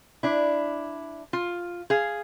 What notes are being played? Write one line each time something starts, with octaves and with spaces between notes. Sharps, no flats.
D4 E4
F4
G#4 F5